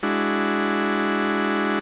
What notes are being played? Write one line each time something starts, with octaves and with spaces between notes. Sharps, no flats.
G#3 D4 E4 F#4